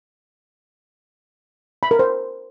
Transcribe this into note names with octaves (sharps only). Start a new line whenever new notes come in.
B5
A#4
C5